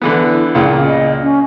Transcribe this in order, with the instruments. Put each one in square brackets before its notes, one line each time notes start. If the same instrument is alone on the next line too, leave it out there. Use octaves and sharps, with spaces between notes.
[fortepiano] D3 E3 B3 [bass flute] E4
[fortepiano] C#2 A#2 C#3
[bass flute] D#5
C#4